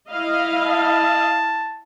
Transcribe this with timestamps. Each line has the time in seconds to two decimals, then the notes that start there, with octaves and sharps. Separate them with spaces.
0.12 E4 D#5 F5
0.66 A5